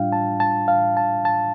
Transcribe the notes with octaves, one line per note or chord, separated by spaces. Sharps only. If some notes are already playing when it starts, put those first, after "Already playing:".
Already playing: A2 G3 D4 F4 F5 G5
A5
A5
F5
A5
A5